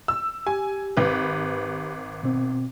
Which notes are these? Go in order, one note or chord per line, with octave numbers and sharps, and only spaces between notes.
E6
G4 G#5
G#1 B4
B2 C4